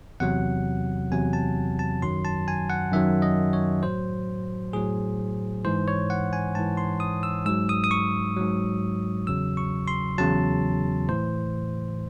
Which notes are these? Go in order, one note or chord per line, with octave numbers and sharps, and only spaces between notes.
E2 C3 F#3 F#5
E2 C3 F#3 G#5
A5
A5
F#2 D#3 F#3 C6
A5
G#5
F#5
F#2 D#3 F#3 E5
D#5
C#5
A2 F#3 C5
A2 F#3 G#4
G#2 E3 C5
C#5
F#5
G#5
G#2 E3 A5
C6
D#6
E6
G#2 F#3 E6
D#6
D#6
C#6
G#2 F#3
E2 C#3 F#3 E6
C#6
C6
E2 C#3 F#3 A5
A2 E3 C5